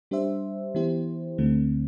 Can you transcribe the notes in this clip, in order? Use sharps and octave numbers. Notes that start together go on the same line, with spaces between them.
G3 D4 G4 C5 E5
E3 B3 E4 G4 C5
D2 D3 A3 C4